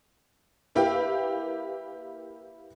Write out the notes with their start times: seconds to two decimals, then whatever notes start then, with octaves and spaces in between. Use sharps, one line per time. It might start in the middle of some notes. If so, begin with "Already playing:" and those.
0.75 A#3 E4 G4 B4 F5 G5